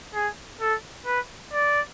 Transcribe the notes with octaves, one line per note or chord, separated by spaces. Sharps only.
G#4
A4
B4
D5